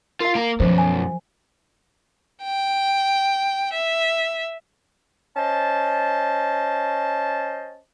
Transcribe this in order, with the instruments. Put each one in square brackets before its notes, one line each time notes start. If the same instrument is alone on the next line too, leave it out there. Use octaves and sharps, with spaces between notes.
[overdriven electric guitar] F4 [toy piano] A#4 F5
[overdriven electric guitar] A#3 A#5
[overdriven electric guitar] B1 F#2 [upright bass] F3 [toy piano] C5
[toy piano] G#5
[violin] G5
E5
[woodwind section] C#4 C5 D#5 A5